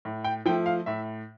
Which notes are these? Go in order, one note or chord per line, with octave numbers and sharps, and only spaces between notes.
A2
G5
F3 A3 G5
F5
A2 E5